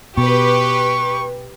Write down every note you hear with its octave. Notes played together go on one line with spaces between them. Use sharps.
B2 G4 B4 C#6